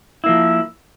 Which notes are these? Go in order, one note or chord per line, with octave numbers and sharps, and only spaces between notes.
F3 A#3 E4